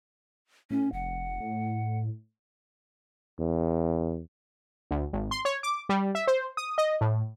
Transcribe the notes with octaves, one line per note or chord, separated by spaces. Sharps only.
A2 C#4
F1 F#5
A2
E2
D2
G#1
C6
C#5
D6
G3
E5
C5
D#6
D#5
A2